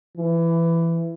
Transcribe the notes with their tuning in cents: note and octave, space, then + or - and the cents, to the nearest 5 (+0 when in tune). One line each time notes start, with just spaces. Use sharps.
E3 +15